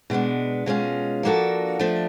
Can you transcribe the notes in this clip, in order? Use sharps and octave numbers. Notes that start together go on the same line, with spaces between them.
B2 G#3 B3 D4
B2 G#3 C#4 F4
F3 A#3 D4 F#4 A4
F3 A3 D4